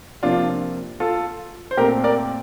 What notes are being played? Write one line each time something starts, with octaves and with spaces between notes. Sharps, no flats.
C3 F3 A#3 D4 F4
F4 A4
C5
A#2 A3 C4 G4 A#4
A#4 D5